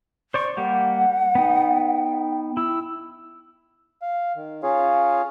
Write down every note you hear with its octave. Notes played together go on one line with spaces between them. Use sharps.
C5 D5 C#6
G3 A#3 G4 F#5
B3 D#4 G5
E4 E6
F5
D#3
C#4 F4 G#4 C#5 F5